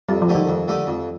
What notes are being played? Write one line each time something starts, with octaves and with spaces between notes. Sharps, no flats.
F2 G3
F3
D3 A3 D#4 G4
D#3
F2
D3 A3 D#4 G4
F2